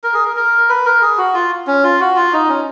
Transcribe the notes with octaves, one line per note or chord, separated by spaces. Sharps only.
A#4
G#4
A#4
A#4
B4
A#4
G#4
F#4
F4
C#4
F4
F#4
F4
D#4
C#4